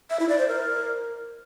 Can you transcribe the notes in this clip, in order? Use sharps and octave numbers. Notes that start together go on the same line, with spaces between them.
E5
E4
D5
C5
A#4